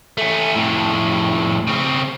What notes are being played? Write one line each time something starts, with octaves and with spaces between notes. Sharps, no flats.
A3 C#4
F2 A2
C#3 C4